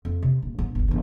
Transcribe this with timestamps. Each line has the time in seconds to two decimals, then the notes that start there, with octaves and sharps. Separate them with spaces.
0.05 F2
0.23 C3
0.42 D#1
0.59 G#2 B3
0.75 G1 D2
0.88 G1 E2